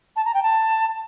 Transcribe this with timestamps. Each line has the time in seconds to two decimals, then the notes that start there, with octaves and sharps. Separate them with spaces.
0.16 A5
0.25 A#5
0.34 G5
0.43 A5